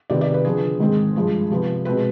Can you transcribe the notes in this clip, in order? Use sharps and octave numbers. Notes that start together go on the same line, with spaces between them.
C3 D#3 B3 D5
D5
B4
D3 F3 B3 G#4
G#2 D#3 G#3 C4
G2 F3 G#3
C3 F3 B3
B2 G#3 C4 B4